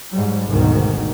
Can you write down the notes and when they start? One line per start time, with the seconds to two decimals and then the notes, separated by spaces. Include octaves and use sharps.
0.12 G#2 F#3 G3
0.47 G#1 D2 G#2 B2 D#3